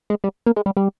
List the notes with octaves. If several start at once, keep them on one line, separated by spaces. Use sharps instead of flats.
G#3
G3
A#3
G#3
G3
G3